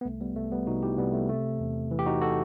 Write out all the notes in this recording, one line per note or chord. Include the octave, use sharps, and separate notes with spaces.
B3
C2 A3
G3 B3
C2 A3
G3 B3
C3 D#4 F#4
E4 G4
C3 G3 B3
A3
C3 A3
E2
E3
G4
D#4 F#4
F#4 A4